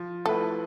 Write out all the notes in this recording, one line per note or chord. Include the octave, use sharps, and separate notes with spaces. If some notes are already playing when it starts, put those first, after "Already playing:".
Already playing: F3
A3 E4 A4 B4